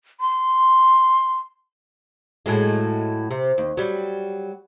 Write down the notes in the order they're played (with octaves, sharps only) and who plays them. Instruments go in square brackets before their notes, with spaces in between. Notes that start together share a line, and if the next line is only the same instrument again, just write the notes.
[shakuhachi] C6
[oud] A2 F#3 G#3
C3
D#2
F#3 G3